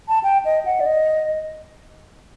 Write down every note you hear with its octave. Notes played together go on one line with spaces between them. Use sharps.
A5
G5
D#5
F#5
D5
D#5